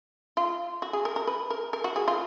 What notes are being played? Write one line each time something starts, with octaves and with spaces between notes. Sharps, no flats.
F4
F#4
G#4
A#4
A#4
B4
A#4
A#4
F#4
G#4
F4